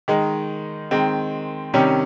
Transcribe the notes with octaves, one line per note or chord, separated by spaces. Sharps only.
D#3 G#3 D#4
D#3 G#3 C4
C3 D#3 G3 C#4